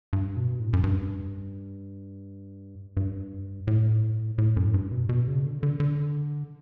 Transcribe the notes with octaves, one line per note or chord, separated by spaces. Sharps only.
G2
B2
A2
F#2
G2
G2
A2
A2
F#2
A2
G2
B2
B2
C#3
D3
D3
D3